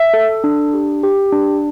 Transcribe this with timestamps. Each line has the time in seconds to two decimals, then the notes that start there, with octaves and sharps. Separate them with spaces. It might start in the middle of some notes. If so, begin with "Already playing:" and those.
Already playing: E5
0.14 A4
0.44 D4
0.74 G4
1.03 G4
1.32 D4